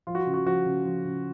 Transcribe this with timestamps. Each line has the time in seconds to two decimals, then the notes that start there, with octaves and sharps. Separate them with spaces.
0.07 F3 F4
0.15 F#4
0.20 F4
0.26 C#3
0.34 F#4
0.46 F3 F#4
0.66 C#3
0.86 F3
1.05 C#3